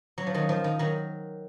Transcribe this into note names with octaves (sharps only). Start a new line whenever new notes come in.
F#3
F3
D#3 F#3
F3
D#3
D#3 F#3